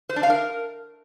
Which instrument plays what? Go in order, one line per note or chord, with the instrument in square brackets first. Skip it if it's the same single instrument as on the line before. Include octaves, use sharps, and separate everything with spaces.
[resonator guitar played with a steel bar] C5
D4
F5
A#4